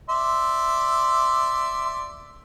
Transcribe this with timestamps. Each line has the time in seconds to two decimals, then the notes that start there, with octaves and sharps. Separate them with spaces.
0.09 D5 E5 C6